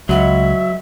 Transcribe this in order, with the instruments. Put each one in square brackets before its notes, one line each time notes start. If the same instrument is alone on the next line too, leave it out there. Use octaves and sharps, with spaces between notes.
[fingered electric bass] C#2 [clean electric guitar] F#3 [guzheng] G#3 B3 F4 [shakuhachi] E5